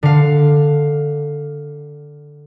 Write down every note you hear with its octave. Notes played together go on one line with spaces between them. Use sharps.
D3 F5